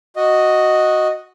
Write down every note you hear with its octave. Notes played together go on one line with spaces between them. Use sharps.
F#4 D#5